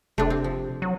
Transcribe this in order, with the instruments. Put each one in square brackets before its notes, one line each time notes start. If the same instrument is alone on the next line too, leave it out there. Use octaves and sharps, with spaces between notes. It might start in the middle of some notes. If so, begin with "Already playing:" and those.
[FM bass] F1 [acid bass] C3 [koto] A3 D4
[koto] C4
F3
[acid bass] F#3